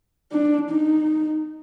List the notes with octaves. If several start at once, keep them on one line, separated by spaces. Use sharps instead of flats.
D4
D#4